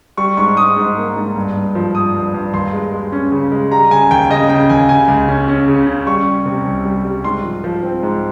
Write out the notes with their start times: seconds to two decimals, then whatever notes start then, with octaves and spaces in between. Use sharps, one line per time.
0.17 G3 C#6
0.37 G#2 C#6
0.57 G#2 D#6
0.77 G#2
0.97 A#3
1.16 G#2
1.36 G2
1.56 G2
1.75 F3
1.95 G2 D#6
2.15 G2
2.34 G2
2.53 D#2 C6
2.73 G#3
2.92 G#3
3.12 C#4
3.32 C#3
3.52 G#3
3.71 G3 A#5
3.91 C#3 G#5
4.11 D#2 G5
4.30 C#3 D#5
4.49 C#3 G5
4.69 D#2 G#5
4.89 C#3 G#5
5.08 C#2
5.28 C#4
5.48 C#4
5.67 C#3
5.87 C#4
6.07 G3 C#6
6.26 G3
6.46 C3
6.65 C2
6.85 G3
7.05 G3
7.24 G#2 C6
7.44 F3
7.64 F3
7.83 C4
8.03 G#2